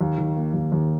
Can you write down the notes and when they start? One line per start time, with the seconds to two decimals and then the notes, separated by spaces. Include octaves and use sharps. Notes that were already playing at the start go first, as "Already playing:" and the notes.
0.01 D#2
0.18 D#3
0.37 A#3
0.54 D#2
0.72 D#2